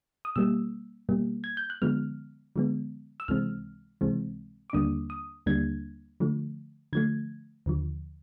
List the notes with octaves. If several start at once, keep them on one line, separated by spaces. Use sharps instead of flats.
D#6
B2 G3 A#3 E6
B2 G3 A#3
G#6
G6
F#6
D3 F3 G#3 B3 F6
D3 F3 G#3 B3
E6
C#2 C3 E3 G#3 C4 F6
C#2 C3 E3 G#3 C4
D6
D#2 D3 G3 A#3 D4 D#6
D#6
D#2 D3 G3 A#3 D4 G#6
D3 F3 A3
D3 F3 A3 G#6
D#2 D3 F3